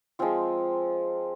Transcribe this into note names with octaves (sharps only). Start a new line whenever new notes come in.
F3 G#3 C4 F4